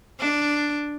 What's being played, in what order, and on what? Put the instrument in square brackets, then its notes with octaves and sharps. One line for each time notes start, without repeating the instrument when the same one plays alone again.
[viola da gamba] D4